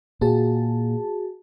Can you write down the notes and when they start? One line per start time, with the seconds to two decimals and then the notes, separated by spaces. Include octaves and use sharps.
0.21 A#2 F#4 G#4 A5